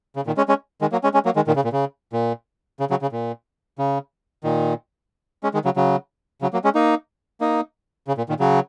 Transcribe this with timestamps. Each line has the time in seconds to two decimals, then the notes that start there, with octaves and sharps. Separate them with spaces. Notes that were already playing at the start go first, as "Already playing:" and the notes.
0.16 C#3
0.26 A#2 D#3
0.37 G#3 C#4
0.48 G#3 C#4
0.81 D#3 G#3
0.92 F#3 A#3
1.03 G#3 C#4
1.14 G#3 C#4
1.25 F#3 A#3
1.36 D#3 G#3
1.47 A#2 D#3
1.56 C#3
1.64 A#2
1.72 C#3
2.13 A#2
2.80 C#3
2.90 C#3 F#3
3.02 C#3
3.12 A#2
3.79 C#3
4.44 A#2 D#3
5.43 G#3 C#4
5.54 D#3 G#3
5.65 C#3 F#3
5.76 C#3 F#3
6.42 C#3 F#3
6.53 F#3 A#3
6.64 G#3 C#4
6.75 A#3 D#4
7.41 A#3 D#4
8.08 C#3
8.18 A#2
8.29 A#2 D#3
8.40 C#3 F#3